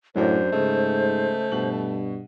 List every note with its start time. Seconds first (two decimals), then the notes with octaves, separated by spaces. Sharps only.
0.16 F#2 A2 F#3 D4 C5
0.52 G#2 C#3 A3 D#4
1.52 G2 B2 F#7